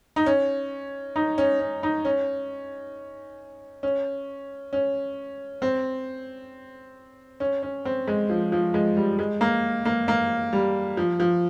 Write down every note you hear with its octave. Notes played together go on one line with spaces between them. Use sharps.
D#4
C#4
D#4
C#4
C#4
D#4
C#4
C#4
C#4
C4
C#4
C#4
C4
G#3
F3
F3
G#3
G3
G#3
A#3
A#3
A#3
G3
F3
F3